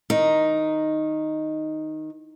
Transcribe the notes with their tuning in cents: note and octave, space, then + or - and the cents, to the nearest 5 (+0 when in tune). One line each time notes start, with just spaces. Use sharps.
D#3 +0 D#4 +0